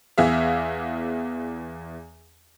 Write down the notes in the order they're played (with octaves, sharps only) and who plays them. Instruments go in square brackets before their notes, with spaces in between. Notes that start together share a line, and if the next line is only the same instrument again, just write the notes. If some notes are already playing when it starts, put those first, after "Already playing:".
[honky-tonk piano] E2 E3 G#4 E5 F5